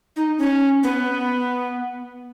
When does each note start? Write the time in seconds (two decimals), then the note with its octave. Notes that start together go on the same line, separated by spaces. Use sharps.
0.16 D#4
0.38 C#4
0.83 B3